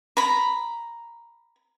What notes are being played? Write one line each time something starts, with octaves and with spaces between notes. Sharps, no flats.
A#5 B5